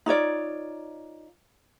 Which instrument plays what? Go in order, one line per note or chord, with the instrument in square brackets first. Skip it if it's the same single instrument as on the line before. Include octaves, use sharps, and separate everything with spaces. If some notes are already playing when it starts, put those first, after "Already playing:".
[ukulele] D#4 F4 C#5 D5